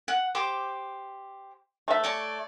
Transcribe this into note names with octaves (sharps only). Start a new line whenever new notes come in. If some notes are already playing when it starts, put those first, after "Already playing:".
F#5
G4 C5 D6
A3 E5
C#5 D5 A5